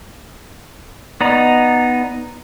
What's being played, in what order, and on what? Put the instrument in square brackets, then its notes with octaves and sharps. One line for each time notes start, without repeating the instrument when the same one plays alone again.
[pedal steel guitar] B3 D#4 D5 A#5